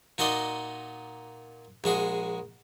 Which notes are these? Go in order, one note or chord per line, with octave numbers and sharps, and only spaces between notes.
A#2 D#4 F#4 D5 D#5 C6
A#1 G#3 F#4 G#4